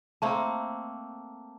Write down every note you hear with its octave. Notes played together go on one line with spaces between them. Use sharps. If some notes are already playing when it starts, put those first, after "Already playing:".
A3 A#3 C4 A5